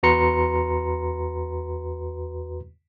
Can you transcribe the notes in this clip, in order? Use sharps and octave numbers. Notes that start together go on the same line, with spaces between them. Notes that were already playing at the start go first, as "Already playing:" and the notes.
E2 F#4 B4 A#5 C6 C#7